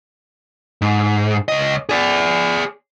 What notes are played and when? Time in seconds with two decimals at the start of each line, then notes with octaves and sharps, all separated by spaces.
0.82 G#2
1.48 C#2 D#5
1.89 G#4 D5